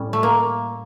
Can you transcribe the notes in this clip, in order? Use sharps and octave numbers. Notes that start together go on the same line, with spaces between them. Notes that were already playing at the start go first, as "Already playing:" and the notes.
Already playing: A2 G3 C#4
A3
A#3